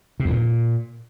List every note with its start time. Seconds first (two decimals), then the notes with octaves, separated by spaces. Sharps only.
0.20 C3
0.25 E2
0.31 A#2